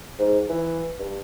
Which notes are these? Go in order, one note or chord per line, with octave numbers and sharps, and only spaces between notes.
G#2
E3
G2